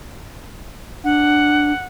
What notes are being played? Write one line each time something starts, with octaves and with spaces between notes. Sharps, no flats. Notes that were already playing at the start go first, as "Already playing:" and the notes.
D4 F#5